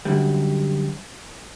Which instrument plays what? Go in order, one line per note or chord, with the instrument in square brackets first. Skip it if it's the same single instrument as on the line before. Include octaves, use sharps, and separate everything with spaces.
[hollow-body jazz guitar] F#2 D3 G3